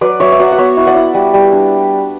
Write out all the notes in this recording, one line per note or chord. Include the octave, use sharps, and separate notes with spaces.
F#3 B4 D5
F#3 C#5 E5
E5
F#3 D5 F#5
F#5
B3 C#5 E5
E4
D5 F#5
E4
G3
G3
D4